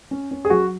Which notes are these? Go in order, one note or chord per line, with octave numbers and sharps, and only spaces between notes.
C#4
C#4
G#4
F#3 F#4